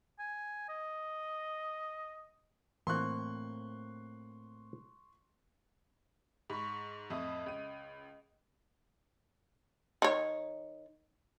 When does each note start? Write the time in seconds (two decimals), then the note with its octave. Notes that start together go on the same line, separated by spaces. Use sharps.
0.19 G#5
0.69 D#5
2.87 A2 E3 A#3 C4 C6 C#6 F#6
6.50 G#2 B5 C#6
7.10 F2 A2 D#5 E5 D#6
7.46 C#2 D#7
10.02 D#3 C#5